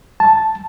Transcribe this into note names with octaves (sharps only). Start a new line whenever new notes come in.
A5